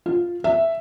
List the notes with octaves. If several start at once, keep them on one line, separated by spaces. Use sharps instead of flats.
F4
E5